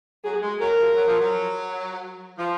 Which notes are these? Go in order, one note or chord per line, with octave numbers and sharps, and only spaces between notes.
F#3 G#4
G#3
F#3 A#4
F3
F#3
F3
F#3
F3